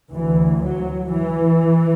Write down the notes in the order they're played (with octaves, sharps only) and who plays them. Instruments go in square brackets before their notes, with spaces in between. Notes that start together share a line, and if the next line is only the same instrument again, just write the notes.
[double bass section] D2 E3
F#3
E3